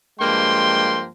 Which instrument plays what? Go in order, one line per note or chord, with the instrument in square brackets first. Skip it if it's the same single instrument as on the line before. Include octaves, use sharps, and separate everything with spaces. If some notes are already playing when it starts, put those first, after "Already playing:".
[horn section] G2 F3 G#3 A#3 G5 C6